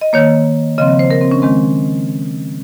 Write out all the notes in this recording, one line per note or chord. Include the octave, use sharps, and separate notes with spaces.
D#5
D#3 A#3 C#5
C#3 F3 C4 D#5
D#5
C5
A#4
C4
C#4
D#3 G#3 C4